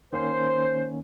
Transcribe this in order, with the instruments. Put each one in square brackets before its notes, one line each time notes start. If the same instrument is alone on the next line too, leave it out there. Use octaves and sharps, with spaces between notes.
[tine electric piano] D#3 A#3 C#4 [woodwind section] C5